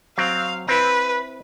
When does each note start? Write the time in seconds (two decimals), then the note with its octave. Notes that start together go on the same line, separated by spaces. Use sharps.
0.18 F#3 C4 F5
0.69 C4 E4 B4